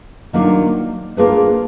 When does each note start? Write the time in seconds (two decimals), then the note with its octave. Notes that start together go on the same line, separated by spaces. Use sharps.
0.33 D#3 F#3 A#3 D4 F4
1.17 A#3 D4 F4 G#4 B4